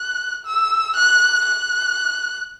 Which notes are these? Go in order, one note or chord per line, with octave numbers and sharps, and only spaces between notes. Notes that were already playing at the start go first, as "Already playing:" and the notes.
Already playing: F#6
E6
F#6
F#6